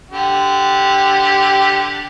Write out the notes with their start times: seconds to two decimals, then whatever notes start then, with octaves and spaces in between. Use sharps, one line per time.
0.11 D3 G4